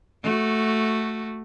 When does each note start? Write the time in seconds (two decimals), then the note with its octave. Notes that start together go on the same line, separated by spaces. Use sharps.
0.22 A3 F#4